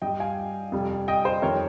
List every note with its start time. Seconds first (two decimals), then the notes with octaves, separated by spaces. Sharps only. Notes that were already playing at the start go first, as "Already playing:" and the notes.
0.02 G2 G3 D#5 G5
0.20 F5 G#5
0.72 F2 C3 G3
1.08 D#5 G5
1.25 C5 D#5
1.42 F2 D#3 G3 A#4 C#5